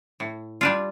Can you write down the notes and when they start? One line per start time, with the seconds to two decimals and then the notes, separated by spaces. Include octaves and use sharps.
0.20 A2
0.61 G3 D4 F4